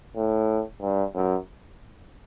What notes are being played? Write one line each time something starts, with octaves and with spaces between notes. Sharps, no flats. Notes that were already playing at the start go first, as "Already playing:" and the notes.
A2
G2
F#2